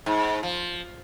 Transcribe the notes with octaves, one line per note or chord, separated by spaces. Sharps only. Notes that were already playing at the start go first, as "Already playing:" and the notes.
G#2
F3